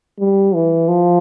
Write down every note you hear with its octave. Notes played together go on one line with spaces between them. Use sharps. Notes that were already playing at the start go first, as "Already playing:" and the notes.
G3
E3
F3